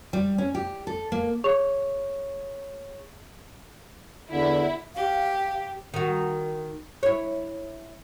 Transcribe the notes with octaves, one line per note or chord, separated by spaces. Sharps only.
G3
C#4
G4
A4
A#3
G#4 C#5 C#6 F7
E2 D3 E4
G4 F5
D#3 F#4
E4 C#5